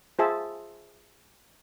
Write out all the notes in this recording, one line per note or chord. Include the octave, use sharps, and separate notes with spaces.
F4 G#4 C5 E5 A5